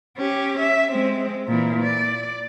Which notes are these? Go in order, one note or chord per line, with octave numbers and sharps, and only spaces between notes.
C#4 G4
E5
G#3 C4
A#2 E3
D5